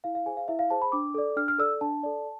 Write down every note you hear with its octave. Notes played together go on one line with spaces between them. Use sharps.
E4 F5
F5
G#4 C5 G#5
F5
E4 E5
F5
G#4 C5 A5
B5
D4 D6
A4 D5
D4 F6
F6
A4 D5 E6
D4 A5
A4 D5